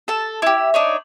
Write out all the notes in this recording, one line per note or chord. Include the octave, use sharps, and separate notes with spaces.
A4 A5
E4 G4
D4 D#4 C#5